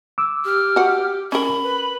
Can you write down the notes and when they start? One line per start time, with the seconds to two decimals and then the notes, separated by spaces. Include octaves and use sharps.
0.18 D6 E6
0.45 G4 F6
0.76 F#4 F#5
1.32 C#4 A#4 B5
1.64 B4